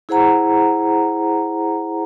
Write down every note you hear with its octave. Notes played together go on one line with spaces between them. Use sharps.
E4 G#4 C5 F#5 A#5